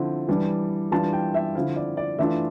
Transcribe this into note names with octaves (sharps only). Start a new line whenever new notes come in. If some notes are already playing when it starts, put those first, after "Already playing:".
Already playing: D3 F3 C4 E4
E3 G3 D4
E3 G3 D4 F4 A5
G5
E5
D3 F3 C4 E4 F5
D5
D5
E3 A3 D4 F4 E5